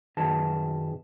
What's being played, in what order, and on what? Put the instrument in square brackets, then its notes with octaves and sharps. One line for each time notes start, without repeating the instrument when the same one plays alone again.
[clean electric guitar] B1 F#2 D#3 G#4 B4 A5